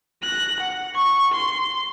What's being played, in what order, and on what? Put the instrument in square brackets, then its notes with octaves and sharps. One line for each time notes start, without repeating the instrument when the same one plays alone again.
[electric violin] F#6 A#6
F#5
C#6
C6